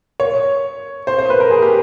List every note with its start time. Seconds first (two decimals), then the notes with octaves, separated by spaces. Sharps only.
0.20 C#5
1.07 C5
1.19 C5
1.30 B4
1.40 A#4
1.51 G#4
1.62 G4